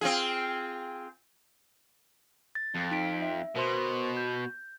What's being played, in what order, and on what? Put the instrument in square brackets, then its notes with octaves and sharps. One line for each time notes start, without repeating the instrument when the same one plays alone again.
[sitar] C4 F4 G#4
[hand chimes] A6
[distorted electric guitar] F2
[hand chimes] D#4 B6 D7
E5
[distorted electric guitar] B2 [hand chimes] A#4 C5 C6
[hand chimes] G6